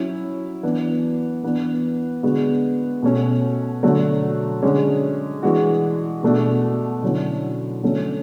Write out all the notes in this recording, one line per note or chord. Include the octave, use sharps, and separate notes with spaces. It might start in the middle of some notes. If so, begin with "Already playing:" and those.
Already playing: F#3 C#4 E4
E3 B3 D4
E3 B3 D4
D3 G#3 B3 F#4
B2 A3 C#4
D3 F#3 A3
D3 G#3 C#4
E3 G#3 D4 F#4
B2 A3 D4 F#4
D3 F#3 C#4 E4
D3 F#3 A3 C#4